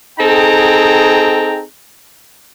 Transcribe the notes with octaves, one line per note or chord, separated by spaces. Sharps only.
C4 D#4 G#4 A4 G5 A#5